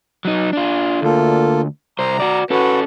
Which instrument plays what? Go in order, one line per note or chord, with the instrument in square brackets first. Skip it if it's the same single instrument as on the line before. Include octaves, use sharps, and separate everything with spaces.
[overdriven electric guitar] F#3 D#4
D4 F4
[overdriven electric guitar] D2 [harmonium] A#3 F4 A4
[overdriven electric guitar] C2 C5 [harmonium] A#5
[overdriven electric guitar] F#4 D5
[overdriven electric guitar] C#4 A4 [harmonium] F#4 B4